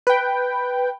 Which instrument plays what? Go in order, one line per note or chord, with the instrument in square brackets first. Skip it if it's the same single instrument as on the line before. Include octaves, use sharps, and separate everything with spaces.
[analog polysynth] B4 G5